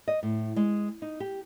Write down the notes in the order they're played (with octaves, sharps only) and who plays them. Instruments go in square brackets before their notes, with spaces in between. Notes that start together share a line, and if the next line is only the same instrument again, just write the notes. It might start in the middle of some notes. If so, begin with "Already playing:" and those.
[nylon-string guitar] D#5
A2
G#3
D#4
G4